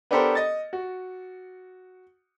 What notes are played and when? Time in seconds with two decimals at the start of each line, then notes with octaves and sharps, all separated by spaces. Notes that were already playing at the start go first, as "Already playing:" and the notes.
0.11 B3 D4 G4 A4 A#4 C5
0.35 D#5 A6
0.73 F#4